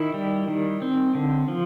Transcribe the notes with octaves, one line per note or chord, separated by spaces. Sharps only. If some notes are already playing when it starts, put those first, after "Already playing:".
Already playing: D#3 E4
G3
D#3
C4
D3
F3